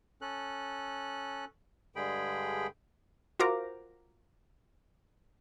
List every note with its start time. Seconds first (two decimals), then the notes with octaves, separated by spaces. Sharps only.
0.22 C#4 A4 F#6
1.96 G2 D3 G#3 G#4 G5 B5
3.40 F4 F#4 A#4 C5 A#5 D6